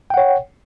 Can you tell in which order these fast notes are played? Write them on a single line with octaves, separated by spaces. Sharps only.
G5 F#5 C#5